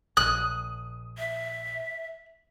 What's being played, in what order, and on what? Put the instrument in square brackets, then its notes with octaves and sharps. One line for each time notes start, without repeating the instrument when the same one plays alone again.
[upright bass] A#1 [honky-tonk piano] D#6 [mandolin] F#6
[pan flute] E5